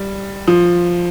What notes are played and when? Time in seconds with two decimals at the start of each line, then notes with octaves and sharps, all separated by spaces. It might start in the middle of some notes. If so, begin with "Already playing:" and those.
Already playing: G3
0.48 F3